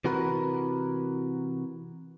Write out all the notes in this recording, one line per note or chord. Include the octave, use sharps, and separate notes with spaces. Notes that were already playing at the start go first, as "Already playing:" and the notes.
C3 E3 F#4 A#4 B4